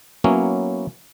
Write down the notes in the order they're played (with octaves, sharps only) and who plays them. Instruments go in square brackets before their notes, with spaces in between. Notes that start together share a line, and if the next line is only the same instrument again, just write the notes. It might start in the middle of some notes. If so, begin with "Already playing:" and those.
[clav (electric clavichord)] F#3 A#3 B3 C#4 E4